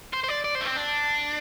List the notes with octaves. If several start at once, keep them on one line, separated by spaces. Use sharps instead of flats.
C5
C5
D5
D5
C5
A3
C4
D4